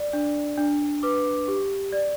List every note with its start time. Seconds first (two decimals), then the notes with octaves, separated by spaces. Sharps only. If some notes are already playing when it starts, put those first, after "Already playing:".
Already playing: D5
0.13 D4
0.58 D4
1.03 B4 D6
1.48 G4
1.93 D5